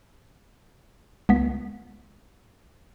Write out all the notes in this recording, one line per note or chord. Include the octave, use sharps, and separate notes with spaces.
C#2 B3 B6